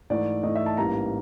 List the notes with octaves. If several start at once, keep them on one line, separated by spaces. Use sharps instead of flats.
G#2 E3 A3 D5
G#2 E3 A3 D#5
E5
A5
A1 G#2 E3 G3 A#3 A#5